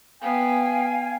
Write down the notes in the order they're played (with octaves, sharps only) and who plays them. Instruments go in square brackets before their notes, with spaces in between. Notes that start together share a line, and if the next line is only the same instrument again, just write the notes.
[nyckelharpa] B3 [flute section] F5 G5 G#5